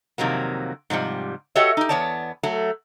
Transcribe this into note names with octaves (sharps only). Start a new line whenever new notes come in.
F2 C3 D#3 F#3 A#3
G#2 C3 F3 G3
F#4 G4 A4 C#5 D#5 E5
D#4 G4
E2 B3 C#5 D5 A5
F#3 A3